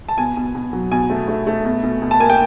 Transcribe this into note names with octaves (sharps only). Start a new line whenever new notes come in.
A5
B2 G#5
B2
B2
F#3
B2 G#5
A3
A3
A3
B2
B2
B2
A5
A#3 G#5
G5